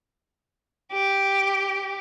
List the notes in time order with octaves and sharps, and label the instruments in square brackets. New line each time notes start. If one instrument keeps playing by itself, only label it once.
[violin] G4